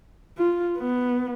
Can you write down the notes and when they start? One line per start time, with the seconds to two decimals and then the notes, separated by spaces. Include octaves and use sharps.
0.38 F4
0.79 B3